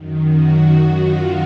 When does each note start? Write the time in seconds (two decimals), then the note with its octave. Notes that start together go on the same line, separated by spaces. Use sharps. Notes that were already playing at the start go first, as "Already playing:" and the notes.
Already playing: F#2 D#3
0.27 F#4
0.95 F4